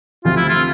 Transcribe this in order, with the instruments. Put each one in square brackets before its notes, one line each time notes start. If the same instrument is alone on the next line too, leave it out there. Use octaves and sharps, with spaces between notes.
[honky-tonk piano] D2 C3 F3 [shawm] F4
[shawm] E4
F4